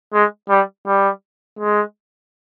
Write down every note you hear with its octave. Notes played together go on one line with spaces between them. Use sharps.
G#3
G3
G3
G#3